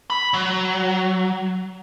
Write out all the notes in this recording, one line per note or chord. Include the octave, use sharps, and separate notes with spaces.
B5
F#3